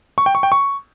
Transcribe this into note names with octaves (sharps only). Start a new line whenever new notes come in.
C#6
G5
C#6
G5
C#6